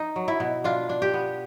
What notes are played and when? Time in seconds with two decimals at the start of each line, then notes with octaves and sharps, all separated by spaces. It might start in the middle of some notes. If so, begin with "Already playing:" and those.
Already playing: D#4
0.16 F#3
0.28 E4
0.40 B2
0.64 D4 F4
0.89 D4
1.02 G4
1.14 B3